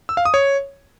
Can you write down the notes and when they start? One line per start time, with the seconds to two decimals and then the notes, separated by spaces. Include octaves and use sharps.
0.09 E6
0.17 F5
0.25 D#6
0.34 C#5